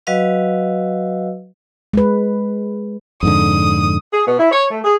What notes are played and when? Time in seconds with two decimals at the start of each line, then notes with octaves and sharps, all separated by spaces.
0.07 F#3 F#4 B4 D#5 F5 E6
1.93 G#3 B4
3.23 F2 G#2 D3 D#6
4.12 G#4
4.26 B2
4.39 E4
4.51 C#5
4.71 A3
4.84 G#4